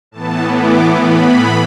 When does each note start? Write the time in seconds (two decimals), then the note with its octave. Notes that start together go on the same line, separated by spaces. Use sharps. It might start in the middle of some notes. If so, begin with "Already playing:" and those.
0.11 A2 E3 B3 A5
0.54 D6
0.97 B5